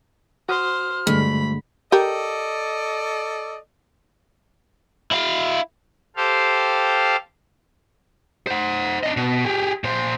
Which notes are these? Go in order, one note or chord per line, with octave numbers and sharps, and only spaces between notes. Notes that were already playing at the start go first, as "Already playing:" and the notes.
F#4 C5 D#6 F6
D2 G2 D3 G#3 B5
G4 A4 A#4 D5 D#5
E4 F5
G4 A4 C5 F5
C5 F#5
D4 D#5
B2
G4 G#4
A#2 C5